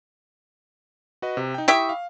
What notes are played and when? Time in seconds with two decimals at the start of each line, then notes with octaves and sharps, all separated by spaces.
1.22 F#4 B4 D#5
1.37 C3
1.54 D#4 G5
1.68 E4 G4 E5 G5 C#6 D#6
1.89 F5